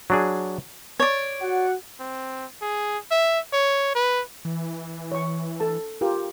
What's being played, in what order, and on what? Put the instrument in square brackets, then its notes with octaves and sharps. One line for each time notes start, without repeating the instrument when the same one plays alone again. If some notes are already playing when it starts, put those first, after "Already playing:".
[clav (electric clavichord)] F#3 D4 G#4
[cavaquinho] C#5 D5
[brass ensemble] F#4 F#5
[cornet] C4
G#4
E5
C#5
B4
[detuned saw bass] E3
[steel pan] C#5 C#6
A4 A5
F4 G4 A#4